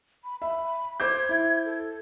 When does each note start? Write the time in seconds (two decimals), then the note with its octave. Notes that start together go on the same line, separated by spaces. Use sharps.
0.24 B5
0.42 E5 B5
1.00 C5 D6 G6 G#6
1.29 E4
1.66 A4